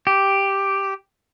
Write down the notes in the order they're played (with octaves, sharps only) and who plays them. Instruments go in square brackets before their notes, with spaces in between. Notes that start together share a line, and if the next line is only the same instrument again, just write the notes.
[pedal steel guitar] G4